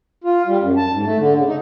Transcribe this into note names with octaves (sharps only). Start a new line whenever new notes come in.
F4
G3
F#2
A5
G#2
A3
D3
C#3
D#4